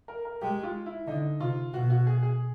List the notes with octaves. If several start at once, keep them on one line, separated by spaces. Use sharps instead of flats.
A#4
A#4
G#3 G4
F4
E4
D3 D#4
C3 F4
B2 F#4
F#4
G#4
G#4